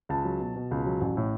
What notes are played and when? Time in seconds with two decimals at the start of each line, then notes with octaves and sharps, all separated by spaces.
0.09 C#2 A5
0.25 F#3
0.40 B2
0.56 B2
0.71 C#2
0.86 F#3
1.01 A1
1.17 A2